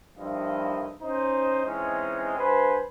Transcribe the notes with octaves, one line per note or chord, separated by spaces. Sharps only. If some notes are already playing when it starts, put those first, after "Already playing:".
G2 D#3 F3 E4 D#5
C#4 D#4 C5
E3 G#3 C4 C#4 D#4
G2 B4 C5 G#5